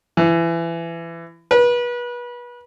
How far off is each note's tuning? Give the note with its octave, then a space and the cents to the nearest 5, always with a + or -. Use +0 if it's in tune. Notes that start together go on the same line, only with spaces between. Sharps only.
E3 +25
B4 -30